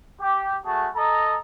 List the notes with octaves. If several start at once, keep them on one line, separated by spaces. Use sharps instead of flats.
G4
A3 F#4 G#4 A5
A4 D#5 A#5